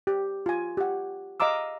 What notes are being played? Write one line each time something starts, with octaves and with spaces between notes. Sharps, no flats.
G4
F4 G#5
G4 F#5
D#5 F5 A#5 D6 E6